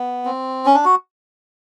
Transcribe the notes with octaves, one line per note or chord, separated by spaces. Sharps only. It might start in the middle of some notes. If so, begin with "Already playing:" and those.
Already playing: B3
C4
C#4
D4
F#4